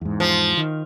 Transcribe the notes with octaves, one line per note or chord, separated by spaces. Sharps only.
E2 G#2
F3
D#3